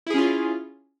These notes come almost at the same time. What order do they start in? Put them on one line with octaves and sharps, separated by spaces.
E4 G#4 C#4 F4